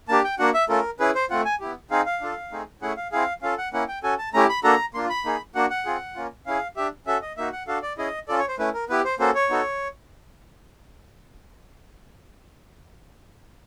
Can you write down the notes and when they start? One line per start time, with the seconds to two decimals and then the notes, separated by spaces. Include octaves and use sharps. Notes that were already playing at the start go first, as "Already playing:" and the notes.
0.09 A#3 D4 G4 A5
0.24 G5
0.39 A#3 D4 F#4 F#5
0.54 E5
0.69 A3 C#4 F4 A4 A#4
1.00 C#4 E4 G#4 B4
1.15 C5
1.30 A3 C4 F4 F#5
1.45 G#5
1.60 B3 E4 G4
1.91 C4 D#4 G#4 F5
2.06 F5
2.21 D4 F4 A4
2.52 A3 C4 D#4 G#4
2.82 A3 C#4 E4 G#4 F#5
2.97 F5
3.12 C4 E4 G#4 F5
3.42 C#4 F4 A4 F5
3.58 F#5
3.73 A#3 C#4 E4 F#5
3.88 G5
4.03 C#4 F#4 A4 G#5
4.18 A5
4.34 A3 C#4 E4 G4 A#5
4.49 B5
4.64 A#3 D4 F#4 A4 A#5
4.94 A#3 D4 F4 C6
5.09 B5
5.25 A#3 D#4 G#4
5.55 A#3 D4 F#4 F#5
5.70 F#5
5.86 C4 F4 G#4
6.16 A#3 C#4 F4
6.46 C#4 E4 G#4 F5
6.76 D4 G4 E5
7.07 C#4 F#4 A4 E5
7.22 D#5
7.37 A#3 D#4 F#4 E5
7.52 F#5
7.67 D4 F#4 A4 F5
7.82 D5
7.98 C#4 E4 G#4 D#5
8.28 C#4 F4 A4 D5
8.38 C#5
8.48 C5
8.59 A3 C#4 E4 B4
8.74 A#4
8.89 B3 E4 G4 B4
9.05 C5
9.19 A#3 C#4 F#4 A4 C5
9.35 C#5
9.50 B3 D#4 F#4 A4